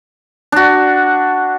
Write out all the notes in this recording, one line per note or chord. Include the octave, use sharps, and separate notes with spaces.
D4 F#4